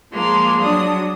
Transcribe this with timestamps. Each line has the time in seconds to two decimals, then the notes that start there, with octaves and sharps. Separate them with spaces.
0.12 F3 G#3 A#3 C6
0.61 F#3 D4 D#6